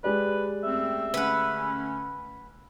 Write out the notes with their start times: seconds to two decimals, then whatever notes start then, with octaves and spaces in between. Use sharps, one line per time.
0.04 G#3 G4 B4 D5
0.64 F#2 A3 C4 E5
1.14 D3 A3 C#4 B4 F#5